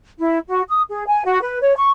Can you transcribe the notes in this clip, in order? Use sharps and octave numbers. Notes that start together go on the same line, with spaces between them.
E4
F#4
D#6
G#4
G#5
F#4
B4
C#5
C#6